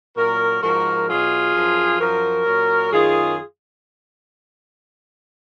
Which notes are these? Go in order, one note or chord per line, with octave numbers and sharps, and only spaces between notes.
A#2 F#3 F#4 A#4
G#2 F3 F#4 A#4
B2 F#3 F4 G#4
F#2 F3
F#2 F3 F#4 A#4
A#2 F#3
F#2 D#3 F#3 F4 G#4